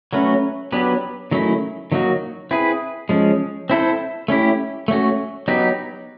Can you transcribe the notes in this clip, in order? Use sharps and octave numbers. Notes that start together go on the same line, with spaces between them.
F#3 A3 C#4 F#4 B4
F#3 B3 D4 G4 B4
D#3 F#3 A3 C#4 E4
D#3 F#3 A#3 D#4 F#4
C4 E4 G#4 B4
F3 G#3 C#4
C4 E4 A4 C5
A3 C#4 E4 G4
A3 C#4 F#4
F#3 B3 D#4 G4